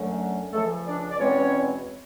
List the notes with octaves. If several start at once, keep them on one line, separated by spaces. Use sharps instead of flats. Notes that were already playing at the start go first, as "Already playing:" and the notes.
Already playing: F#2 D3 F#3 A3 C#4
C#2 C#3 F3 A3 A4
D4 D5
D5
E2 B2 G#3 C4 C#4 C#5